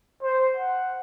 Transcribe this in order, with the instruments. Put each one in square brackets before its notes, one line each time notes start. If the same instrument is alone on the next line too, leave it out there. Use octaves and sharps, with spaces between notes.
[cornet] C5
F#5